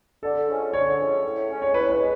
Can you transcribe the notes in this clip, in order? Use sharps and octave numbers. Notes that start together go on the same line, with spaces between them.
D3 A4
F3 G#3 C#4
D3 C#5
F3 G#3 C#4
A2
G#3 C#4
C#5
A2 B4
B4
G#3